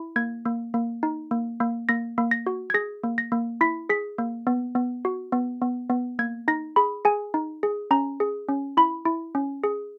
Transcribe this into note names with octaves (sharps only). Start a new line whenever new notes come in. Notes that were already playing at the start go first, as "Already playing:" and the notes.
Already playing: E4
A#3 G#6
A#3
A#3
D#4
A#3
A#3
A#3 A#6
A#3
A#6
F#4
G#6
G#4 A#6
A#3
A#6
A#3
E4 B6
G#4 B6
A#3
B3
B3
F#4
B3
B3
B3
A#3 G#6
D#4 A#6
G#4 B5
G#4 G#5
D#4
G#4
C#4 A#5
G#4
C#4
E4 B5
E4
C#4
G#4